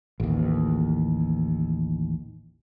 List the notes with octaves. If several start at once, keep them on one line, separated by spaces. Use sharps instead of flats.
A1 D#2